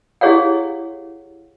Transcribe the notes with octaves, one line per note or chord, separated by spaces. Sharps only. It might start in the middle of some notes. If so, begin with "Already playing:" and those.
E4 G4 G#4 C#5 F5 F#5